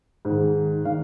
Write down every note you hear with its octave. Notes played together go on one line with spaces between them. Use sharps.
G#2 D#3
D#3 F5